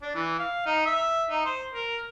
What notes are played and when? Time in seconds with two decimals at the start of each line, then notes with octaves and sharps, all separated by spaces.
0.02 D4
0.15 E3
0.39 F5
0.66 D#4
0.86 E5
1.30 D#4
1.46 C5
1.74 A#4